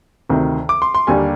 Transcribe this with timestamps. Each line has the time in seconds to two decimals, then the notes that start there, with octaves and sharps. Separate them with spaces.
0.29 D2 C3 D#3
0.69 D6
0.82 C6
0.95 C6
1.07 D#2 D3 G3 A#3 G#5